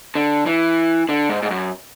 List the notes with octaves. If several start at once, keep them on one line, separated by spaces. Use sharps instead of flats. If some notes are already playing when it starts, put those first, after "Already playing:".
D3
E3
D3
G#2
G#2
F#2